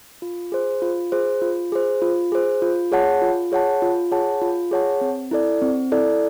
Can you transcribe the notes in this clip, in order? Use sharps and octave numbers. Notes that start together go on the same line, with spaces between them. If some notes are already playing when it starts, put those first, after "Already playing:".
F4
G#4 C5
F4
G#4 C5
F4
G#4 C5
F4
G#4 C5
F4
G#4 C#5 F#5 A5
F4
G#4 C#5 F#5 A5
F4
G#4 C#5 F#5 A5
F4
G#4 C#5 F#5 A5
C4
E4 A4 D5
C4
E4 A4 D5